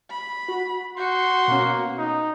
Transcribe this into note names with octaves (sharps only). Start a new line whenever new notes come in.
B5
F#4
F#4 C6 G6 C#7
B2 A#3 C#4
D#4